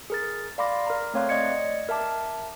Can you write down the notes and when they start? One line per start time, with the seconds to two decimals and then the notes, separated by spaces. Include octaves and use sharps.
0.10 G#4 A#4 A6
0.58 D5 F5 B5 C6 D6 A#6
0.86 A#4 A#5
1.14 A3 C4 C#5 F5 C6 F#6
1.29 D5 D#5 G#6 C#7
1.89 A#4 E5 A5 D6